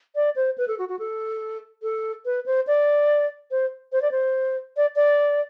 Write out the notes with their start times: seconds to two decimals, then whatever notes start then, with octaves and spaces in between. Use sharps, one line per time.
0.15 D5
0.36 C5
0.58 B4
0.68 A4
0.78 F#4
0.89 F#4
0.99 A4
1.83 A4
2.25 B4
2.46 C5
2.67 D5
3.51 C5
3.92 C5
4.02 D5
4.11 C5
4.77 D5
4.96 D5